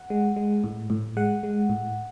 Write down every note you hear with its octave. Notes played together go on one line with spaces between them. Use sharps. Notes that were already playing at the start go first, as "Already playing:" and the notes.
Already playing: F#5
G#3
G#3
A2
A2
G#3 F#5
G#3
A2